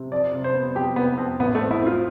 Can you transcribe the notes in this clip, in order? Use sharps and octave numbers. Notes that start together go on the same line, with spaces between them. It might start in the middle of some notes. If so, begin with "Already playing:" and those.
Already playing: C3
F2 D5
C3
C5
B3
F2 G4
C3 B3
F2 C4
A1 B3
A3
C4
E4
C4 F4